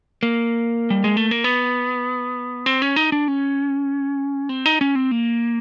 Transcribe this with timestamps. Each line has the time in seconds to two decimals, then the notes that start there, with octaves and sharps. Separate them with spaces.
0.23 A#3
0.90 G3
1.04 G#3
1.17 A3
1.31 A#3
1.44 B3
2.66 C4
2.82 C#4
2.96 D#4
3.12 D4
3.28 C#4
4.49 C4
4.66 D#4
4.81 C#4
4.95 C4
5.11 A#3